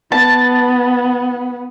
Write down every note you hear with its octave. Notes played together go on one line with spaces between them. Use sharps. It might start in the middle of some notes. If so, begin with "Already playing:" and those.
B3 A5